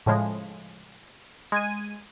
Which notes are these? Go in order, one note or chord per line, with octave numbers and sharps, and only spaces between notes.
A2 C#3 F3 G#3
G#3 G#6 D#7